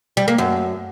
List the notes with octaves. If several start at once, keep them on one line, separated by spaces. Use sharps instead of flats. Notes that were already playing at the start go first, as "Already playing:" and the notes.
G3
A#3
F#2